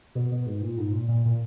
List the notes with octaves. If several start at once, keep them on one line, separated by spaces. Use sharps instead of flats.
B2
B2
G#2
A#2
G#2
A#2
A#2
A#2